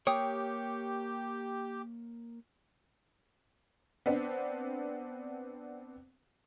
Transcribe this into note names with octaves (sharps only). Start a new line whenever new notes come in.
A#3 G4 C#5 G5 D6 D#6
B3 C4 D4